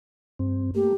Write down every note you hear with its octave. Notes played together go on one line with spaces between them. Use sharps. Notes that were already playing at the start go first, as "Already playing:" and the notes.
G2 C4
A3 A#3 G4